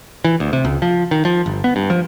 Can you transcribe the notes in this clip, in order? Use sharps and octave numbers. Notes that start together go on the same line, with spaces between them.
E3
D2
C3
C#2
F3
D#3
F3
G1
B3
G2
F3